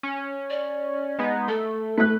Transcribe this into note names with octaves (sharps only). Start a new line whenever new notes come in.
C#4
D5
G#3 B3 D#4
A3 A4
A3 B4 F#6